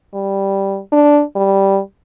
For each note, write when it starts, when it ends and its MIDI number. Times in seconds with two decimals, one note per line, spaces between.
0.14 0.79 55
0.92 1.23 62
1.36 1.79 55